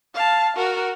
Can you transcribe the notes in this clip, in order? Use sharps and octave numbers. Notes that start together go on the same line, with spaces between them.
F5 A5
F#4 A#4